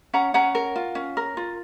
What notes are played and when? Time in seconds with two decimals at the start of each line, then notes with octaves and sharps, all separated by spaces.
0.13 C#4 F#5 A#5
0.34 C#4 F#5 A#5
0.55 A#4
0.76 F4
0.95 C#4
1.17 A#4
1.37 F4